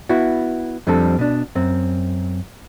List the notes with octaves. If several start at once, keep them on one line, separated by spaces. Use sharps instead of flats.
B3 E4 F#4
F2 F3 G3 C4 D4 A4
B2 D4
F#2 C4